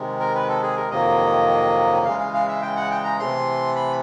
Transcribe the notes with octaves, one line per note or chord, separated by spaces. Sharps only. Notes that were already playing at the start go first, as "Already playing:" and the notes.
Already playing: C3 D#3 G#3
A#4
B4
A4
G#4
A#4
F2 C3 D#3 F#3 A#3 D#5
C#3 E3 G#3 F5
F5
F5
E5
G5
F#5
G5
A#5
C3 E3 A3 C6
B5